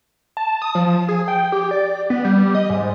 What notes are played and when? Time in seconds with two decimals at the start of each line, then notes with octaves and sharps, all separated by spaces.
0.37 A5
0.62 D#6
0.75 F3
1.09 G#4
1.28 G5
1.52 G4
1.71 D5
2.10 B3
2.25 G3
2.55 D#5
2.70 G#2